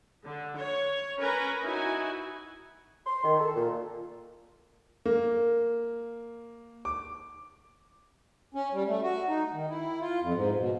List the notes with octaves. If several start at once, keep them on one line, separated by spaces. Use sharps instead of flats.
D3
C#5
C#4 A#4 B4 G#5 A#5
D#4 E4 F#4 G#5
C6
D#3
A4
A#2
A#3
D6
C#4
G3
A3
F#4
D#4
D#3
E4
F4
F2
G#2
B2